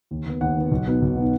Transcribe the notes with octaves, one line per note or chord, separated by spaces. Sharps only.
D#2
D#3 B3
D#2 F#5
D#3 B3
B1
B2 B3 D#4
B1
B2 B3 D#4